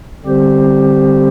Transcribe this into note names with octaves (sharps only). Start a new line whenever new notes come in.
D3 G3 C4 G4 C5